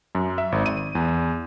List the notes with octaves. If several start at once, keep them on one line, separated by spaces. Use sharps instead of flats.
F#2
E5
G#1
D#7
E2